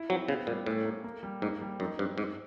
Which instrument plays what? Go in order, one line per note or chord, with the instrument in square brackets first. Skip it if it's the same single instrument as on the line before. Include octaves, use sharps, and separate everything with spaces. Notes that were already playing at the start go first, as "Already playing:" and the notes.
Already playing: [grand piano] E4
[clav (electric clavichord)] F#3 [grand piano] C4
[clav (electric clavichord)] C#3 [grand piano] B3
[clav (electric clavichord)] A#2 [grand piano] G3
[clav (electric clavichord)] A2 [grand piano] C#4
[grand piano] A#3
A#3
G3
[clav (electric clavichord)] G#2 [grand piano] A#3
[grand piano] G3
[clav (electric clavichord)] F#2 [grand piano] D#4
[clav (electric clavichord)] G2 [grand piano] C4
[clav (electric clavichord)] G#2 [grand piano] C4